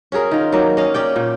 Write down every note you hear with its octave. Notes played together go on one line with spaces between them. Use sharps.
C#4 F#4 G#4 A#4
D#3 F4
F#3 A#3
C#4 D#5 F5
C#4 D5 G5
A#2